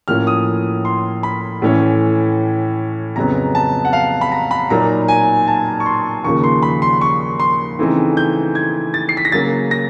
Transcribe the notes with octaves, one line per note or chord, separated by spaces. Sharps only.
A2 F3 A#3 C#4 F6
D#6
C6
B5
A2 E3 A3 C#4
F2 C#3 F#3 B3 A#5
A5
F#5
F5
B5
A#5
B5
A#2 F#3 A#3 D#4 A#5
G#5
A5
C#6
C6
D#2 C#3 F3 A#3 C#6
C6
B5
C6
C#6
C6
C#3 E3 A3 C4 D#4
G6
G#6
A6
C7
B6
A#6
C#3 F#3 A#3 A6
A#6